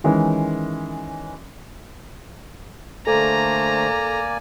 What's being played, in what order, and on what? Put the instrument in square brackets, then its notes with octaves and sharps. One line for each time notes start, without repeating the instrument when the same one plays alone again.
[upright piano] D#3 E3 G#3 C#4
[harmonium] D3 A3 C5 [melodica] A#3 D5 G#5 [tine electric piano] A4 [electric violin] A#5